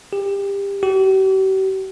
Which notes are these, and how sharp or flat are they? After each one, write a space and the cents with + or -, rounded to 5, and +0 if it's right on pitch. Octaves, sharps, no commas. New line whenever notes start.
G4 +25
G4 -45